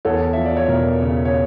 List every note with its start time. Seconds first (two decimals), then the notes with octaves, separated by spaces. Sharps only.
0.05 E2 A4 C#5
0.33 F3 E5
0.46 D5
0.57 C#5
0.69 E1 A#4
1.02 C#3
1.25 C#5